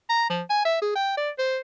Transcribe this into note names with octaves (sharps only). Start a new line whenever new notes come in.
A#5
F3
G#5
E5
G#4
G5
D5
C5